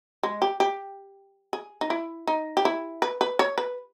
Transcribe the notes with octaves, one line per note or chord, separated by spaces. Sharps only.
G#3
G4
G4
G#4
D#4
E4
D#4
G4
E4
B4
B4
C#5
B4